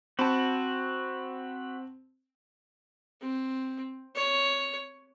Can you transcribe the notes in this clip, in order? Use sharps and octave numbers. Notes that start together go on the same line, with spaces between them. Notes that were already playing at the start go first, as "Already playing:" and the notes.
C4 F#4 A5 B5
C4
C#5